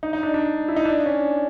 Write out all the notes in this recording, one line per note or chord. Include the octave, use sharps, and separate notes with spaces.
D#4
D#4
D4
D4
E4
D#4
D4
C#4